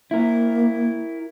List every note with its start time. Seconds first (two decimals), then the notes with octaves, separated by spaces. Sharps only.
0.11 A#3 E4 A#4